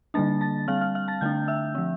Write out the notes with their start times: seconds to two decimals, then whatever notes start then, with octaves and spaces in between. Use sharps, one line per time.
0.14 D3 G3 A#3 D4 A5 A6
0.41 A5 A6
0.68 G3 C4 F5 F6
0.81 F5 F6
0.95 F5 F6
1.08 A5 A6
1.21 D3 A3 D4 G5 G6
1.48 E5 E6
1.75 F3 C4